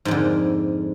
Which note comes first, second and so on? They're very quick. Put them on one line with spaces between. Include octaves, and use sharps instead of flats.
G#2 F2 D3